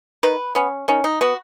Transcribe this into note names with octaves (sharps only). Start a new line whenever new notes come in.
D#3 B4
B3 C#4
D#3 C#4
D#4
B3 F#4